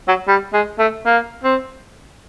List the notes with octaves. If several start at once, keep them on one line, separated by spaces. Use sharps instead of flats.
F#3
G3
G#3
A3
A#3
C4